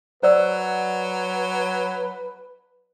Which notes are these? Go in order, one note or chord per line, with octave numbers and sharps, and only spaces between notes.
F#3 B4 C5 D5 E6